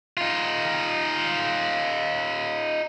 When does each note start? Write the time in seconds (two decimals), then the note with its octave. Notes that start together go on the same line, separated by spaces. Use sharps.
0.17 D#4 F4